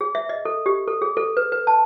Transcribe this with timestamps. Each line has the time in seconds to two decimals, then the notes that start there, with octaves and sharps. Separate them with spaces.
0.01 G#4
0.15 E5
0.29 D#5
0.45 A4
0.66 G4
0.88 A4
1.02 G#4
1.17 A4
1.37 B4
1.52 B4
1.67 A5